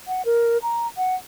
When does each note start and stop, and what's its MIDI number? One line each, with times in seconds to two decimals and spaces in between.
0.08 0.22 78
0.25 0.58 70
0.62 0.87 82
0.97 1.15 78